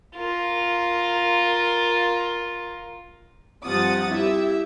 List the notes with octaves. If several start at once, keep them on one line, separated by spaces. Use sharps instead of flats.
F4 A#4
G2 C3 F3 F#5 D#6 A6
E4 G4 E5